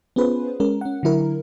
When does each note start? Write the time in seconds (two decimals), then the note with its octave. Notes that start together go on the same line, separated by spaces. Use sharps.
0.16 B3 C#4 F4 G#4 B4 C5
0.60 G#3 C#4 A#4
0.81 C#4 F#5
1.03 D3 F#3 E4 A#4